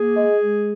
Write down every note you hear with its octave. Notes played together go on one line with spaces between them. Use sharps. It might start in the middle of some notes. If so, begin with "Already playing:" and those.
Already playing: A#3 G#4
G#3
G#3